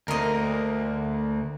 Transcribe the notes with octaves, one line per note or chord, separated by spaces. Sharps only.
D2 A#3 A#4 D#5 A#5